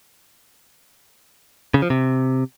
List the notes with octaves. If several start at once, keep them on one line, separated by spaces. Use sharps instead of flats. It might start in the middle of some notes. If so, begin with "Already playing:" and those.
C#3
F3
C3